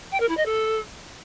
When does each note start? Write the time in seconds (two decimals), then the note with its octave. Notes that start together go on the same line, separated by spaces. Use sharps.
0.12 G5
0.20 A#4
0.28 E4
0.37 D#5
0.45 A4